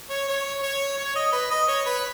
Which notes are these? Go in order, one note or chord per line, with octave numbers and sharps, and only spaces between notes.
C#5
C#5
C#5
C#5
D#5
B4
D#5
C#5
B4